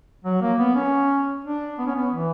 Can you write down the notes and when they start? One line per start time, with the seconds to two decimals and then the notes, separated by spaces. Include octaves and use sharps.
0.24 F#3
0.41 A#3
0.59 B3
0.75 C#4
1.45 D4
1.79 B3
1.87 C#4
1.95 B3
2.13 E3